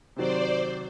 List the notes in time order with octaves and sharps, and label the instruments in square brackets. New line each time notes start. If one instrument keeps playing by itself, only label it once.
[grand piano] C3 D#3 F#3 [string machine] C5 D5